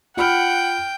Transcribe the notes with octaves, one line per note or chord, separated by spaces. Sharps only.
F4 F#5 G5 B5 F6